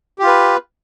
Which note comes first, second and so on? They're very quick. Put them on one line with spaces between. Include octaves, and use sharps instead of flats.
G4 F4 B4